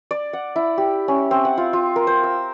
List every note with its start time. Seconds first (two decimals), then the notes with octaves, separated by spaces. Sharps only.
0.11 D5
0.33 F#5
0.56 E4
0.78 G4
1.08 C#4
1.31 C4
1.45 F#5
1.57 F4
1.73 F4
1.96 A#4
2.07 C5
2.23 E6